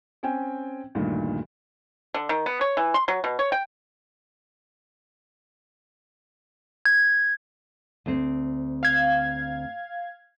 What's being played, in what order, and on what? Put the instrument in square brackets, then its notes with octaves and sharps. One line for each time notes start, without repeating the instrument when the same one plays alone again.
[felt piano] C4 C#4 G5 G#5
D2 G2 A#2 D#3
[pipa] D3
D#3
B3
C#5
E3
C6
F#3
B2
C#5
G5
[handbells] G#6
[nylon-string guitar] D2 C4
[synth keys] F5 G#6